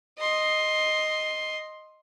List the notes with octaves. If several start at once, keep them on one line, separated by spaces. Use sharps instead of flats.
D#5 C6